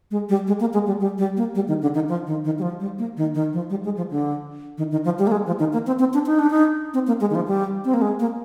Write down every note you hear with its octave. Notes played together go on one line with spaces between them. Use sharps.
G#3
G3
G#3
A#3
G#3
G3
G3
G3
A#3
G3
D#3
D3
D#3
F3
D#3
D#3
G3
F3
G3
A#3
D#3
D#3
F3
G3
G#3
F3
D3
D#3
D#3
F3
G3
A#3
G#3
F3
D#3
A#3
C4
C4
D4
D#4
D4
D#4
C4
A#3
G#3
D#3
F3
G3
C4
A#3
G#3
A#3